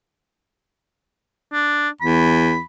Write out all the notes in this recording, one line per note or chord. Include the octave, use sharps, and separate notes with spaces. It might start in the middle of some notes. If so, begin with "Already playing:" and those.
D4
E2 B5